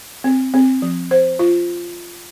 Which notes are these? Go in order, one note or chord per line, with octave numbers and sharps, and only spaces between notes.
C4
C4
F3
C5
F4